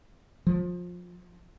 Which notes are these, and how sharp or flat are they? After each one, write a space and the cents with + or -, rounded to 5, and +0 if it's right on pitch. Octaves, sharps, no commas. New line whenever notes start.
F3 +25